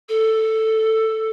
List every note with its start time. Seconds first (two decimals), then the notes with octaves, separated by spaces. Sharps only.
0.08 A4